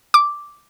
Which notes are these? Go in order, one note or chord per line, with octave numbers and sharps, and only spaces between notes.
D6